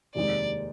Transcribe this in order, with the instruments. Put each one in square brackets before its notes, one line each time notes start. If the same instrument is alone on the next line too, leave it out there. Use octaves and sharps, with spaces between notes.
[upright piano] F1 D#2 D#3 G#3 D#4 [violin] D5